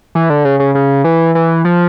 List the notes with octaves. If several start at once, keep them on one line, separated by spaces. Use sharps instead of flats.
E3
D3
C#3
C#3
C#3
E3
E3
F3